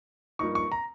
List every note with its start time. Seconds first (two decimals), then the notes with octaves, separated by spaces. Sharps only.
0.39 G2 F3 A#3 D#4 C#6
0.55 C#6
0.72 A#5